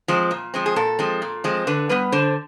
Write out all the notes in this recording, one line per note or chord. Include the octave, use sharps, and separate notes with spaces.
F3 G#3 C4
A#2
F3 G#3 C4
G#4
A#2 A4
F3 G#3 C4
A#2
F3 G#3 C4
D3 B4
G3 B3 B4
D3 C5